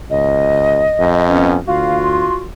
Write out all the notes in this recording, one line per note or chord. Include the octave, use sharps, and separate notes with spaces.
C#2 D#5
F2
B3 C#4
D2 F4 F#4 F5
C6